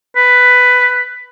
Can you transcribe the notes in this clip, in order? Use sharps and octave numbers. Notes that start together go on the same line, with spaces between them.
B4